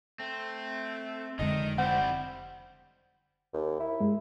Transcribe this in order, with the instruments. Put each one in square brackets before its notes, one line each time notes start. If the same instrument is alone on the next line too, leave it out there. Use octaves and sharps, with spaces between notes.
[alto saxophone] A3 [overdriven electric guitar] C4
[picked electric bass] F1 D3 G#3 [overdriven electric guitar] D#3 [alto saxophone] D#5
[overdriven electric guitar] G3 E4 [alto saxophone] C4 [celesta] F#5
[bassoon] D#2
E4
[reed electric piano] G2 G#3